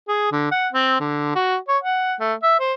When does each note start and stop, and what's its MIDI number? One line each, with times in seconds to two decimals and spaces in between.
0.08 0.28 68
0.32 0.50 50
0.51 0.68 78
0.73 0.96 60
1.00 1.32 50
1.35 1.57 66
1.68 1.78 73
1.83 2.15 78
2.20 2.34 57
2.43 2.58 76
2.60 2.74 72